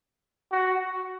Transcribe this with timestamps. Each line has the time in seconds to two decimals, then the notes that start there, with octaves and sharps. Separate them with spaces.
0.52 F#4